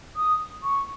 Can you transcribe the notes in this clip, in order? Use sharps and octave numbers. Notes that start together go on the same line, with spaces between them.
D#6
C#6